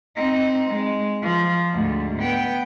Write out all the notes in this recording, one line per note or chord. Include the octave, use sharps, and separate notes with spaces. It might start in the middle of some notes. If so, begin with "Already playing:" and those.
C4 D#4
G#3
F3
D2 G#2
B3 G5